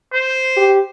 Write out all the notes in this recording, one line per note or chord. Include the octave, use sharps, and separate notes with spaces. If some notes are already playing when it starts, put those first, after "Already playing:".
C5
G4